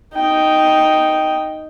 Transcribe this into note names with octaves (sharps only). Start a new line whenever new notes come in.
D#4 G5